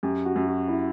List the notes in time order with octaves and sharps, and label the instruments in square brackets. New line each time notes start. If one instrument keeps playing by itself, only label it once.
[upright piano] F#2 [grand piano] G4
[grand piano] F#4
[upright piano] F#2
[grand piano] F#4
E4